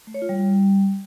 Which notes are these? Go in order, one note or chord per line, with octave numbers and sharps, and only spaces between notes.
A3
C#5
F4
G3